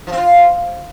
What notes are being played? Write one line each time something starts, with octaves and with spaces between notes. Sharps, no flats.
F3
C4
F4